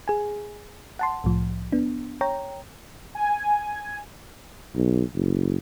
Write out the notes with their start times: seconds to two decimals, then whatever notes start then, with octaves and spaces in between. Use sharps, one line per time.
0.08 G#4 G#5
0.99 F#5 A5 C6
1.24 C2 A2 F3
1.72 B3 D4
2.21 C#5 G5 A#5
3.15 G#5
4.76 B1
5.15 F#1